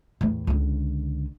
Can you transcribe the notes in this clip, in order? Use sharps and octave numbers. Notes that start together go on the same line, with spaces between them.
E2 A2
C#2 D3